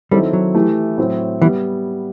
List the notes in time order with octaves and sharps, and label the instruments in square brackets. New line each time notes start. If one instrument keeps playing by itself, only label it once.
[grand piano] D#3 F#3 C4 E4 A4 [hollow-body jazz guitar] G3
[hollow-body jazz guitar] F#3
[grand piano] E3 A3 E4 G4
A2 F#3 C4
[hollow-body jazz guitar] E3 [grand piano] G3 B3